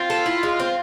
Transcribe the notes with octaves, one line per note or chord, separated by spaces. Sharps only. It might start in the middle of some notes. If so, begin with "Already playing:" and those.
Already playing: C4 F4
A4
E4
G#3
C4